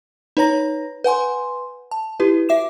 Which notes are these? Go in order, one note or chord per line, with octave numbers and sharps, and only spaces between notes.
D#4 B4 C#5 A#5 A#6
B4 F#5 G#5 C6
A5
E4 G4 B4
F#4 E5 D6 E7